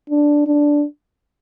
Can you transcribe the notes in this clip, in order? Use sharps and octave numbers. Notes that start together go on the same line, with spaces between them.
D4
D4